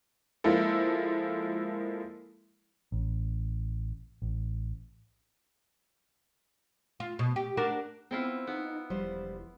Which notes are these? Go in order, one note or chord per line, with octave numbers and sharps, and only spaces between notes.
F3 G#3 A#3 E4 A4
A1
A1
F4
B2
G4
D4 F#4 A#4
B3 C4 E4 F4
B3 D#4
E1 F3 G3 C5